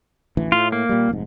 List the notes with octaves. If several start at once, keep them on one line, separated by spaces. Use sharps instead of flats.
A1 D2 E3
A2 F4
A#3
A#2 G3
F1 G#2